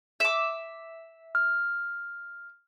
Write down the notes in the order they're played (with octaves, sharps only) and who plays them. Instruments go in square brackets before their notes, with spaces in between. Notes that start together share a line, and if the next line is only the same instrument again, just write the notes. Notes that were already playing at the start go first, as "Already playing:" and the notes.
[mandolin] E5 D6
[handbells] F6